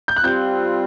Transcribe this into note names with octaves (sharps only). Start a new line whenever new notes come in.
G6
F#6
G3 C4 F4 G6